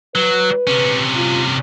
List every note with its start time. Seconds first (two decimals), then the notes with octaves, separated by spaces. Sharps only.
0.15 F#3 B4
0.67 C3 C#4
1.15 F4